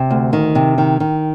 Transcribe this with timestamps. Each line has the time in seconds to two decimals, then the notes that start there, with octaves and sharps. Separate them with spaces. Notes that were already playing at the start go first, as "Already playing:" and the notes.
Already playing: C3
0.10 D2
0.33 D#3
0.55 C3
0.78 D#3
1.00 D#3